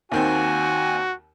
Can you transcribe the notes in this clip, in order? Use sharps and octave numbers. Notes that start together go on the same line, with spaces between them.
D#2 D#3 C4 F#4 G#5